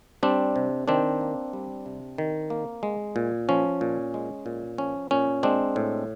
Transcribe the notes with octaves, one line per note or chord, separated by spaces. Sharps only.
G3 C4 D4
C3
D#3 C4 D4
A#3
G3
C3
D#3
A#3
G#3
A#2
F3 C#4
A#2
G#3
A#2
F3 C#4
A#2 C#4
G#3 C4 D4
A2